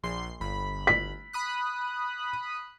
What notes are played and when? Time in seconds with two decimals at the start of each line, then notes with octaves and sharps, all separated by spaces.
0.03 A#1 C6 C7
0.40 G1 B5
0.87 B6
1.33 B5 D#6 F#6